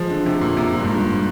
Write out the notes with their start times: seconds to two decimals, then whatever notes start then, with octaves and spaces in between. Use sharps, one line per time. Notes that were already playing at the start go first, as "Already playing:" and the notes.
Already playing: F3 G#3
0.10 D3
0.26 C3
0.41 A#2
0.57 C3
0.72 A#2
0.79 G2
0.85 G#2
0.96 G2